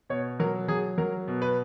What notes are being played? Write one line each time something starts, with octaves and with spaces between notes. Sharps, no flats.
B2 C#5
F#3 A#4
F#3 G#4
F#3 A#4
B2
B4